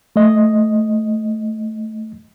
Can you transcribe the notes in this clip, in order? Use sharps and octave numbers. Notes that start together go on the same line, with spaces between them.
A3 D#5